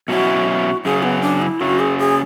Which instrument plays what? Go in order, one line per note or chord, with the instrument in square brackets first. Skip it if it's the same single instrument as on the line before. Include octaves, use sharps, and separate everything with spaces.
[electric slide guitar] B2 F#3 C#4 E4 [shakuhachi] F#4
[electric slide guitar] F#2 C#3 F#3 [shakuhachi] G#4
[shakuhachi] B3
D4
E4
[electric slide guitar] F#2 C#3 F#3 [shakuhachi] F#4
[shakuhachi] G#4
G#4